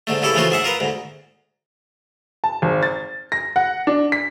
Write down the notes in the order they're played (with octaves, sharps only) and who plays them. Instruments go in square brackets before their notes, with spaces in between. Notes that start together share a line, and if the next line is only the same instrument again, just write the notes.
[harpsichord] G#2 D3 A3
G2 C#3 E4 A4 D5
C#3 E3 F3 A3 F4 F#4
G#2 G#4 E5 F#5
F4 A#4 B4
D2 G#2
[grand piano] A5
G#1
A6
A#6
F#5
D4
B6